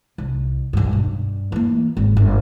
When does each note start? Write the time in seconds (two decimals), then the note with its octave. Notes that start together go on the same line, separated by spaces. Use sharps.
0.18 C2
0.73 B1 G2
0.93 G2
1.52 E3 A#3
1.97 G#1
2.17 G1